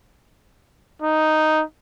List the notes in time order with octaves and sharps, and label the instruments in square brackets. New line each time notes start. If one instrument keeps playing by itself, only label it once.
[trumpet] D#4